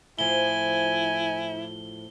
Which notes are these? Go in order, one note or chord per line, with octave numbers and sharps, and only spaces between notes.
A2 F3 E4 G#5 G7